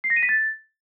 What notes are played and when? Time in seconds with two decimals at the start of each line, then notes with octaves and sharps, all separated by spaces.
0.04 C7
0.10 A#6
0.16 D#7
0.23 B6
0.29 A6